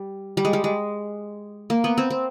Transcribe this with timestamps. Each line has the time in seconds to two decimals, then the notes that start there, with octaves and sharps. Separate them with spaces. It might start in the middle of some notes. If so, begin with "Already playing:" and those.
Already playing: G3
0.37 G3
0.45 G#3
0.53 G3
0.64 G#3
1.70 A#3
1.84 B3
1.98 C4
2.10 C4